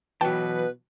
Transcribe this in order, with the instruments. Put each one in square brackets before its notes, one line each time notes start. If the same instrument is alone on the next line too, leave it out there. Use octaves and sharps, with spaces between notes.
[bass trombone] B2 [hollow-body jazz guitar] E3 F#3 [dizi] B4 [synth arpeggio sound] G5 A5